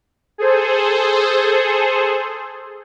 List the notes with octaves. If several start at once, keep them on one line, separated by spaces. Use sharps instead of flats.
G#4 A4 C5